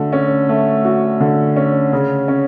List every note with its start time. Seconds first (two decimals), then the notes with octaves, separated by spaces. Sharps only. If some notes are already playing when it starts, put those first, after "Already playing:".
Already playing: D3 A3 F#4
0.12 C#4
0.49 A3
0.85 F#4
1.20 D3
1.56 C#4
1.93 C#3
2.28 C#4